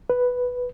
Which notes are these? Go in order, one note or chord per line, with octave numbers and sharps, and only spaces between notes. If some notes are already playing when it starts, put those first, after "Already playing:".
B4